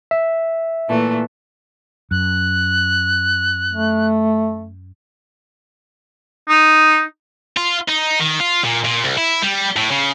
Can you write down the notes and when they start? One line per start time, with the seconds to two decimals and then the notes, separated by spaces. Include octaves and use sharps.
0.11 E5
0.89 A#2 E3 A3
2.11 F#2 F#6
3.73 A3
6.49 D#4
7.57 F4
7.88 D#4
8.20 D#3
8.40 F4
8.64 A#2
8.85 A#2
9.04 C2
9.18 E4
9.42 G3
9.77 A2
9.91 C#3